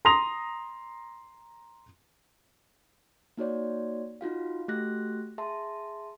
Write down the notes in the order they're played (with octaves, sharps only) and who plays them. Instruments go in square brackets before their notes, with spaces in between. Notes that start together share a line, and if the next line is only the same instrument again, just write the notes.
[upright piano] A#5 C6 D#6 A#6 F7
[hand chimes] A#3 D#4 F#4 C#5 D5
D#4 F4 F#4 F5
A3 F#4 G4 F#6 A#6
G#4 E5 A5 C6